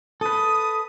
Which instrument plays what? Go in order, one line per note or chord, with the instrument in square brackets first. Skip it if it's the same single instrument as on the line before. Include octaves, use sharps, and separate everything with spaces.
[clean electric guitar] A4 B4 [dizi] D#6